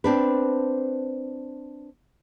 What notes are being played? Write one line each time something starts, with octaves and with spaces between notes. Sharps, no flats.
C4 D4 B4